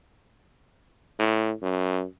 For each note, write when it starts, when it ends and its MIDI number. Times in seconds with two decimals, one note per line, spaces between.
1.19 1.52 45
1.62 2.04 42